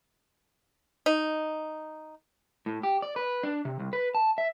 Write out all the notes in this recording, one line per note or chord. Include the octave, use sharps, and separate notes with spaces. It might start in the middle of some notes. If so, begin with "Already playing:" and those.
D#4
A2
G4
D5
B4
D4
C3
C2
B4
A5
E5